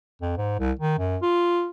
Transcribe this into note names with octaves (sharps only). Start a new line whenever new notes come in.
F2
G#2
C2
D#3
F#2
F4